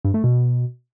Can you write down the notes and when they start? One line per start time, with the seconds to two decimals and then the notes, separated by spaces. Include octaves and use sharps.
0.05 G2
0.14 A3
0.24 B2